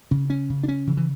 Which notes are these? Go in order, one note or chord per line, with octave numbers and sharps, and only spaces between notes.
C#3 C#4
C#4
C#3
D4
C#4
C#3 E3
E3